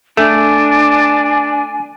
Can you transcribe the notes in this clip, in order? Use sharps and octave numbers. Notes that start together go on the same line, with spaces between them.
A3 D4 G#5